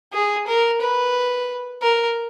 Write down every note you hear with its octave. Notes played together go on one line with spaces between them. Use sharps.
G#4
A#4
B4
A#4